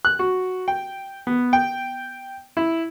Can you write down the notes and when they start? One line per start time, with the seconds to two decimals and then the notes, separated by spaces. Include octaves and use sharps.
0.05 F#6
0.19 F#4
0.68 G5
1.27 B3
1.53 G5
2.57 E4